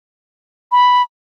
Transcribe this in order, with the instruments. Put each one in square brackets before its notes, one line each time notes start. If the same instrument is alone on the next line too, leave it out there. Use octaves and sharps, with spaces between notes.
[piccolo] B5